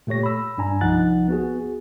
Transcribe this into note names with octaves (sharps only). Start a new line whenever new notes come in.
A#2 A3 G4 C#5 A#6
B5 E6
G2 D4 G#5 A#5
C2 F3 D#4 F#5 F#6 A6
B3 F#4 G#4